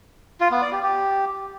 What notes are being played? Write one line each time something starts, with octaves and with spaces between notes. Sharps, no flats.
F4
B3
D5
G4
G4